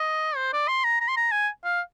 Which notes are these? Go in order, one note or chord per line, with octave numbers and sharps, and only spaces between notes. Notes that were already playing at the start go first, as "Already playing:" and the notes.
Already playing: D#5
C5
D5
C6
A#5
A#5
C6
A#5
G#5
F5